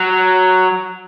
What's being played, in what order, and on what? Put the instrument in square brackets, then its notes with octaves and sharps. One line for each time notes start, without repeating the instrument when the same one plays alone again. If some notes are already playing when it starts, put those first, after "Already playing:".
Already playing: [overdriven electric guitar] F#3